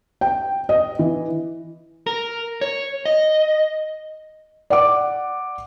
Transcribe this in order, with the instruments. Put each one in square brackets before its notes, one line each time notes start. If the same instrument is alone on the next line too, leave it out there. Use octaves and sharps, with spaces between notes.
[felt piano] G5
D#5
E3
[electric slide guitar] A#4
C#5
D#5
[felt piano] D5 F#5 D6